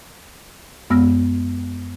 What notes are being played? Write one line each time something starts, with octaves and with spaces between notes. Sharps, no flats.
F#2 G#3 B3 E6 F6 A#6